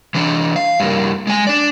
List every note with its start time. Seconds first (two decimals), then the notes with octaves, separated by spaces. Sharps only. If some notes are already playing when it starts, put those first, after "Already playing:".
0.15 E3 D4
0.56 F5
0.80 G2 A#3
1.27 G#3 G#5
1.47 D4 D5